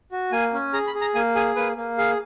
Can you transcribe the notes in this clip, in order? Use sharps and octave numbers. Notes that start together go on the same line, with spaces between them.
F#4
A#3 G#5
C#4
G#4 A#5
B5
G#4
A#5
A#3 G#5
G#4 G#5
A#3 B4
A#3
G#4 F5